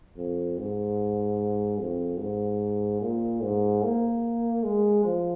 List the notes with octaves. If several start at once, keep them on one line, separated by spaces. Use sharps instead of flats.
F2
G#2
F2
G#2
A#2
G#2
A#3
G#3
F3